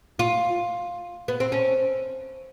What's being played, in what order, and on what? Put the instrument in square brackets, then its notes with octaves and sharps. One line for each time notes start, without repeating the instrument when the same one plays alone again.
[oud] F4
B3
C4
C#4